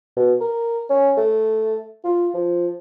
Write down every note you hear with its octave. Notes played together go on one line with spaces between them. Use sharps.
B2
A#4
C#4
A3
F4
F3